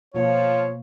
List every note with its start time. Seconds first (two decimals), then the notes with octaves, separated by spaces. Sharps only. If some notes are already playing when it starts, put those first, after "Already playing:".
0.15 B2 F3 A#3 F4 C#5